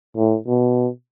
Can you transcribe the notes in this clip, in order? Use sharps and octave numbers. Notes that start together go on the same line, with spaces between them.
A2
B2